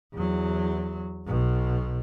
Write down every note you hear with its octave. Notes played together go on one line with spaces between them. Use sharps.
E2 F#3
B1 B2